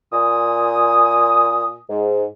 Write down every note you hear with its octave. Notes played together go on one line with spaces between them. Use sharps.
A#2 G#5 D#6
G#2